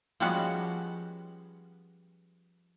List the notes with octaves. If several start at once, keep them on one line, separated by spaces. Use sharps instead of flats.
F3 G3 G#3 B3 C#4 F#4